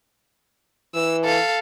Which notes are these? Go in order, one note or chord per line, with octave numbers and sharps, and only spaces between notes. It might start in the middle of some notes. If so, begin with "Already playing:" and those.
E3 E6
A4 F5